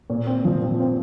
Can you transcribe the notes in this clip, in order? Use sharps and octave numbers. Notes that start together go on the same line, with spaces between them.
A#2
C4
F3
C4
C4